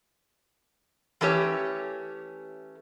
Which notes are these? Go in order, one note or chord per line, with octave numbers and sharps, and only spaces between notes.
E3 A3 C#4 G4 C#5